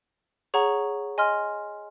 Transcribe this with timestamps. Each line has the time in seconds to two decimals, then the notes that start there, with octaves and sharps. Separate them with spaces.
0.54 G#4 C#5 F#5 A#5 C#6
1.18 D#5 G#5 C6 F6